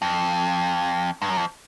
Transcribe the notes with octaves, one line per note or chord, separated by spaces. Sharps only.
F2
G2
F#2
F2